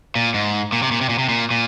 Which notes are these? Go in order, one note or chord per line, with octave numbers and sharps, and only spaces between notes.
A#2
G#2
A#2
C3
A#2
C3
A#2
C3
A#2
A#2